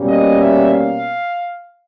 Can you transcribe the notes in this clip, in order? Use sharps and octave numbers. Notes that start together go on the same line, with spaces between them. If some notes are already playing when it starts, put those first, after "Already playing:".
Already playing: B2 G3 A#3 C#4
D#5
E5
F5